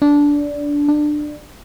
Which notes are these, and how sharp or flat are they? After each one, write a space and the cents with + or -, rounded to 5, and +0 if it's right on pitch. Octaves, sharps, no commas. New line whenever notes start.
D4 -15
D4 +20